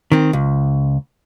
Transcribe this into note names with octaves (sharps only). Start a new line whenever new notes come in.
D#3 C4
C#2